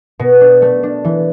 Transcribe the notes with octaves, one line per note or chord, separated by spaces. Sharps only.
B2
D4
A3
D4
E3